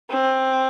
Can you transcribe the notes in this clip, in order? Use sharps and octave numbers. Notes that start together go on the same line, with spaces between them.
C4